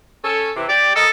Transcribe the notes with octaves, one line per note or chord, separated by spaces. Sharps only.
C#4 A4
C3 E3
G4 D5
A4 A#4 D#5